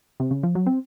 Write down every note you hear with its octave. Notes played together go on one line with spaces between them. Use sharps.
C3
C#3
F3
F#3
C4